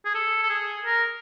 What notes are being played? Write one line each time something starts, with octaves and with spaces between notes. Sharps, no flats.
G#4
A4
A4
G#4
A#4